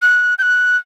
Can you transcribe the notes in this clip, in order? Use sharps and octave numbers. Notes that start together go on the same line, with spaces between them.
F#6
G6
F#6